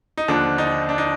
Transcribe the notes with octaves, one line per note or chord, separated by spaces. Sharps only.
D#4
D#2 D3 F3 D4
D#4
D4
D#4